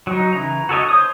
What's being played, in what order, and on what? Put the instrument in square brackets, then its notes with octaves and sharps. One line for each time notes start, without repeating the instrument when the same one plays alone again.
[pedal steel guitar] F#3 D#4
C#3 E3 A#5
F#4 A4 C#5 D#5
C5 C#5 D#6